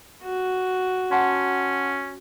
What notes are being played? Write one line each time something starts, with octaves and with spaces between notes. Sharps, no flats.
F#4
C#4 F#5 A5 C6